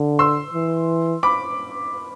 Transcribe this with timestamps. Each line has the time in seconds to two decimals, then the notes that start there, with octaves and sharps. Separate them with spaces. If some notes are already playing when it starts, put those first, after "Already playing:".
Already playing: D3
0.19 C6 E6
0.54 E3
1.23 B5 D6